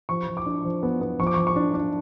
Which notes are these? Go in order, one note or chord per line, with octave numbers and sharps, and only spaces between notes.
F3 C#6
F3
D6
D4
F3
B3
B3
F3 C#6
D6
F3 C#6
C#6
D4
D4